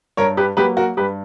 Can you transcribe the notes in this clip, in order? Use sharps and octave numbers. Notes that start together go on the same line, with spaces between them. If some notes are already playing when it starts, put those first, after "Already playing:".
G2 A#4 C#5
G4 B4
F#3 A#3 G4 B4
F#4 A#4
G2 G4 B4